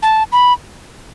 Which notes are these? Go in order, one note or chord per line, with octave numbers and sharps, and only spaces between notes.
A5
B5